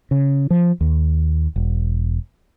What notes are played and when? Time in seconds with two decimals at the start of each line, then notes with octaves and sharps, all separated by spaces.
0.11 C#3
0.50 F3
0.81 D#2
1.56 E1